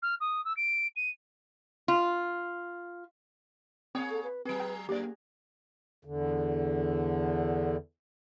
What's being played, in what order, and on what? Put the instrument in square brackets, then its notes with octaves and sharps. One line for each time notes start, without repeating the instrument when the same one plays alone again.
[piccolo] F6
D#6
E6
D7
D#7
[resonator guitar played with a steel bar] F4
[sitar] A#3 G#4 C#5 [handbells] C4 G5 D#6
[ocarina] A4
B4
[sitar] F#3 G#4 [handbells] C4 D7 [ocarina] B4
[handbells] G5
[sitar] F#2 [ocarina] A#3 [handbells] G4 D5
[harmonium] E2 D3